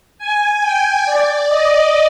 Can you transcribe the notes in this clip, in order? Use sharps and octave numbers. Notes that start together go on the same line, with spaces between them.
G#5
G5
D5
D#5